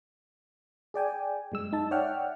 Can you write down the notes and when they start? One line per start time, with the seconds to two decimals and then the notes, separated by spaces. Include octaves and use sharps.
0.94 G#4 D5 G5 G#5
1.52 F#2 G#3 E6
1.73 D#4 A5
1.91 C#5 D5 E5 F#5 G5 F6